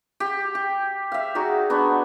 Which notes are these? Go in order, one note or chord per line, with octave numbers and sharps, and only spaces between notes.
G4
G4
E5 F5
D#4 F#4 G#4 D5
B3 D4 C#6